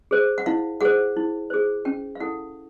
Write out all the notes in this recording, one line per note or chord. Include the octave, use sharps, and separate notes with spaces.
G#4 C5
F#5
E4 F5
G#4 C5 F#5
E4
G#4 C5
C#4 G5
F5
E4 A4 F#5